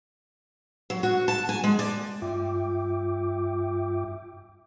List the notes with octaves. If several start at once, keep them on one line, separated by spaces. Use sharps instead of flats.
F#3
F#4
A5
G#5
G#3
D5
G2 F4 E5 G5 D6